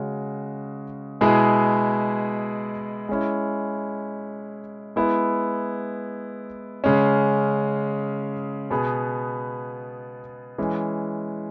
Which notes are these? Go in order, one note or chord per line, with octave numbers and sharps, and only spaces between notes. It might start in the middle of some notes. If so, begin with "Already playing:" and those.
Already playing: C#3 G#3 C#4 F#4
B2 G#3 E4 G#4
G#3 C#4 E4
G#3 B3 E4
C#3 G#3 C#4
B2 B3 G#4
E3 G#3 C#4